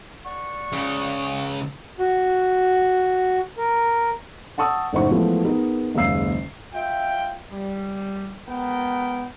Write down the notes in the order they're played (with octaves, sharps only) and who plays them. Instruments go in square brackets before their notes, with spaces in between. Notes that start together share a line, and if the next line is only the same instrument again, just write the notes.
[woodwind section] D5 F#5 C#6
[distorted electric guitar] C#2 C#3
[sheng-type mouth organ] F#4
A#4
[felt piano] F#5 A5 C#6 D#6 E6
F#1 A2 D#4 C5 F#5 C#6
E3 F3 G#3 A3 B3
B3 D#4 G#4 A#4
F#1 D#2 G#3 F5 E6 C7
[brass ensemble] F4 E5 G5
G3
G#3 B3 A#4 G5